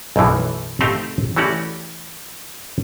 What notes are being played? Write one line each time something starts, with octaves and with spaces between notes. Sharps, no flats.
B1 F#2 A2 E3 F3
A3 C4 D#4 G4 C5 F5
E3 A3 C#4 F#4 G4 D5